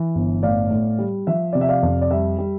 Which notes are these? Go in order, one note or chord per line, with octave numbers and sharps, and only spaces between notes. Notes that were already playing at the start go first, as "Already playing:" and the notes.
Already playing: E3
G1
A2 D5 F5
A2
G3
F3 E5
C3 D5
E5
D5 F5
F2
D5
G3 E5
G3